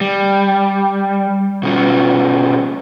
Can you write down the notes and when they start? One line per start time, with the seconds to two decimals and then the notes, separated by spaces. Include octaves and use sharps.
0.01 G3
1.63 B2 C#4 F4